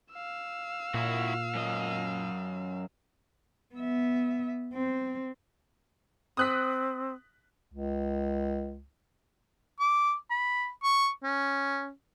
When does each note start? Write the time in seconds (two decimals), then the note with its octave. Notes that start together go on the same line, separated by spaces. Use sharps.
0.13 F5 E6
0.94 A#2 E4 F#4
1.55 F#2 D#5
3.75 B3 E5
4.74 C4
6.37 C4 D#6 F#6 B6
7.73 C#2
9.79 D6
10.30 B5
10.83 C#6
11.23 C#4